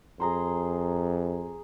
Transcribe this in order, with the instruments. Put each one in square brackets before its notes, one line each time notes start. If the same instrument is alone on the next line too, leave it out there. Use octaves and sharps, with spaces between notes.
[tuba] F2 [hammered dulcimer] G#4 A#5 C6